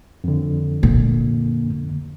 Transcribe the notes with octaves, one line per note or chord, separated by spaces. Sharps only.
F2 D3
A#2